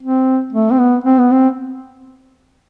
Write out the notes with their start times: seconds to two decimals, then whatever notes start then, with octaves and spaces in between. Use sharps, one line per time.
0.03 C4
0.53 A3
0.71 C4
0.78 B3
1.04 C4
1.19 B3
1.31 C4